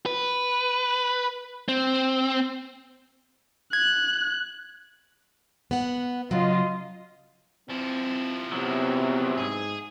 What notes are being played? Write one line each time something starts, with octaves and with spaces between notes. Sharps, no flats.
B4
C4
F#6 G#6
B3 F#5
C#3 F#3 F4 D#5
F3 C4 E4
E2 C3 F#3 B3
G#2 G#4